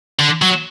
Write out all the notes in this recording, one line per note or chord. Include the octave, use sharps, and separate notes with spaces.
D3
F#3